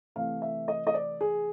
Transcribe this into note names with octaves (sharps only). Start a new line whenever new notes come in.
C3 E3 A3 F5
E5
D#5
D#5
D5
G#4